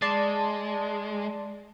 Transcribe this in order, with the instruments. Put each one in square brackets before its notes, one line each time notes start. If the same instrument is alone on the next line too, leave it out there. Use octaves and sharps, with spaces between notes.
[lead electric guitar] G#3 [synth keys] D5 A5 C6